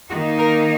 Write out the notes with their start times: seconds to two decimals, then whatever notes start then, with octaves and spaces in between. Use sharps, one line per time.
0.10 D#3 A#3 D#4 F#4
0.39 A#4